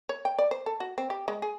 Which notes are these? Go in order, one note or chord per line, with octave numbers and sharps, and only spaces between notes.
C#5
G5
D5
C5
A4
F#4
C4
G4
G#3
G#4